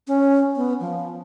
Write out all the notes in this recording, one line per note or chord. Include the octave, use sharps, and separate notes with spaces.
C#4
B3
F3